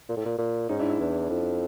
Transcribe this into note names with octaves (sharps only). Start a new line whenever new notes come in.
A#2
A2
A#2
A#2
G#2 C#4 D#4
D4 E4
D4 E4
E2
F2